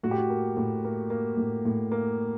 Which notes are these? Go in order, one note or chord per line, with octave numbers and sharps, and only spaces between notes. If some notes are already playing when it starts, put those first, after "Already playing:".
A2 F#4
G4
F#4
A#3
A2
A#3
A#3
A2
A2
A#3